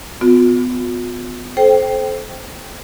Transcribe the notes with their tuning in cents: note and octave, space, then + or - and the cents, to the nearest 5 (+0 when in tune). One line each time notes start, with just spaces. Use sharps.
B3 +25 F4 +45
A4 -30 C5 +0 G5 +0